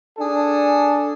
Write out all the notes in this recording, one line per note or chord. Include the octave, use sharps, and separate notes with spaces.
D4 G#4 A4